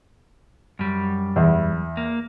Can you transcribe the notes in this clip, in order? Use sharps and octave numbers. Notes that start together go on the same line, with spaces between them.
F#2 G3
E2
A#3